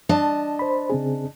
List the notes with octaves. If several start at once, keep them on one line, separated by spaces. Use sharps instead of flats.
D4 D#5 A5
C5 B5
C#3 C4 G#4